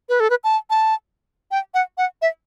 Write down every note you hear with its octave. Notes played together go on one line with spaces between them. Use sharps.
B4
A4
B4
A5
A5
G5
F#5
F#5
E5